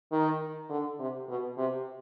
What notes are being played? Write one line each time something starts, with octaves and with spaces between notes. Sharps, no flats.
D#3
D3
C3
B2
C3